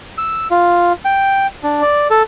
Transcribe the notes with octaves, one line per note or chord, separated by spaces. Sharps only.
E6
F4
G5
D4
D5
A4